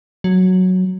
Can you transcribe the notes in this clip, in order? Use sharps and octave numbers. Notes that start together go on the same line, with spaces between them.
F#3